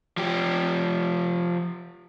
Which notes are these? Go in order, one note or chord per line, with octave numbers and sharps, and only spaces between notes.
F3 G4